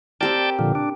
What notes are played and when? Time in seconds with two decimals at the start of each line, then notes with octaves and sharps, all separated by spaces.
0.21 C4 G4 A#4 D5 G5 A5
0.59 A#2 D3 F3
0.75 D4